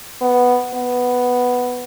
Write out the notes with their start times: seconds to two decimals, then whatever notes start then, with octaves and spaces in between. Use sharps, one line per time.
0.21 B3
0.74 B3